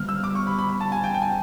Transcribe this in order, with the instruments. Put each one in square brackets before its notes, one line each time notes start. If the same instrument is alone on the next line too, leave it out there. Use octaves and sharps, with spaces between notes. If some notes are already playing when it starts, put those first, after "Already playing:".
Already playing: [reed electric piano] D3 G3 B3 [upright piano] F6
[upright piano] E6
D6
C#6
B5
B5
B5
A5
G#5
G5
G5
G#5